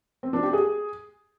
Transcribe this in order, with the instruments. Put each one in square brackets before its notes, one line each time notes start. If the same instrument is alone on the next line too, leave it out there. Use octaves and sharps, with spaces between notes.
[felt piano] C4
D4
G4
G#4